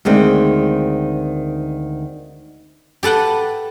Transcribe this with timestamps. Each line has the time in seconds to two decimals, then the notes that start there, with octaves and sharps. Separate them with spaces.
0.05 D2 D#3 G#3 C4
3.03 G4 A4 B4 F#5 G5